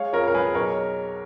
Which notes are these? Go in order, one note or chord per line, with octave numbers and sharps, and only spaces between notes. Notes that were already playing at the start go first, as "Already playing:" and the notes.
Already playing: G#3 C#5 F5
F2 A#4 C#5
A#4
G#3 G#4 B4
B1 A#4 C#5